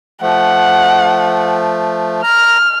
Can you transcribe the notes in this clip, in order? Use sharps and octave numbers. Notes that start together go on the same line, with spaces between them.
F3 A3 F#5
A#5 F6